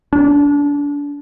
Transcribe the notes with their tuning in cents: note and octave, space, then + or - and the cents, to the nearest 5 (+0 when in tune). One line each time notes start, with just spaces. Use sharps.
D4 -30